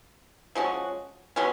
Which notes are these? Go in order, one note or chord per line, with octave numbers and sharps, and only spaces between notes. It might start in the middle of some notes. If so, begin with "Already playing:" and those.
F3 G#3 C#4 F#4
B2 G#3 C#4